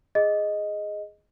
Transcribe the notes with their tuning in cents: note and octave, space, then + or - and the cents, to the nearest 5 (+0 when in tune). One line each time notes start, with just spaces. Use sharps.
G#4 +0 D#5 +0